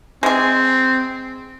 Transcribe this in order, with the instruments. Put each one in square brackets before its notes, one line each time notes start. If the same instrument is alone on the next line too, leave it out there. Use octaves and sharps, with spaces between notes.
[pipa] G#3 G#4 [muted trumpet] C4